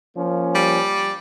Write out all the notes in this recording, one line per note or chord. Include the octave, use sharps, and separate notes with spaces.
F3 A#3 C#4
G3